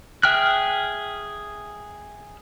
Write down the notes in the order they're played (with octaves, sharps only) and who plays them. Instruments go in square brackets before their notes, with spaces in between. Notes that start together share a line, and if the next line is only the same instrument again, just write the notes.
[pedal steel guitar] G#4 E5 G5 F6 F#6